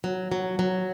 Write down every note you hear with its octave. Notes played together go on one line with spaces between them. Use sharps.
F#3
F#3
F#3